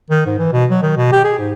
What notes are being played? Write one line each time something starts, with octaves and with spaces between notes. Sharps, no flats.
D#3
G#2
E3
B2
F#3
D#3
B2
G4
G#4
G#2